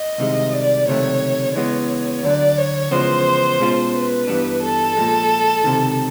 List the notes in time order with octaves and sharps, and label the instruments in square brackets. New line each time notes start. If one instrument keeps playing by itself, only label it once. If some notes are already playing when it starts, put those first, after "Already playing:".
Already playing: [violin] D#5
[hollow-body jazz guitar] C2 C3 D#3 G#3
[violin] D5
[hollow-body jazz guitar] C#2 C3 D#3 F#3 A3 [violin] C#5
[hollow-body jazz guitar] C#3 E3 G#3 B3 [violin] C#5
[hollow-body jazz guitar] D2 D3 F#3 [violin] D5
[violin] C#5
[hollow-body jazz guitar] E2 C#3 F3 G#3 B3 [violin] C5
[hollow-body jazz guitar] B2 G#3 C#4 F4
[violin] B4
[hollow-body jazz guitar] G2 E3 G3 B3 D4
[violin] A4
[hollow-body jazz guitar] A#2 F3 G#3
C#2 C3 D#3